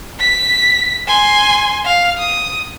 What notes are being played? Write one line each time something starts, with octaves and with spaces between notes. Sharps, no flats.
B6
G#5 C6
F5
D#6